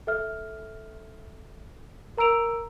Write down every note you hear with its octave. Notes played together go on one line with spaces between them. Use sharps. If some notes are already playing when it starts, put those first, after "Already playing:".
A4 E5 F6
A#4 A#5 E6 D7 F7